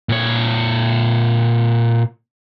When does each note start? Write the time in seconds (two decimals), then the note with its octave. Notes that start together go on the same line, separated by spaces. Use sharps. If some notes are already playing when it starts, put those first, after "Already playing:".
0.09 A#2 C#5